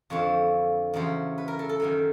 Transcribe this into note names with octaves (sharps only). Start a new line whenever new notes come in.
F2 D3 F3 C#5
E2 C#3 F#3 C5
B4
A#4
A4
A4
F#2 D#3 F#3